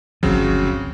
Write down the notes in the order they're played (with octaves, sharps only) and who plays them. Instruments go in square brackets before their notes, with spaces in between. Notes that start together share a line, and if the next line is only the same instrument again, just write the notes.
[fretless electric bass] G1 D2 F3 [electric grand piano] C#3 F#3 C4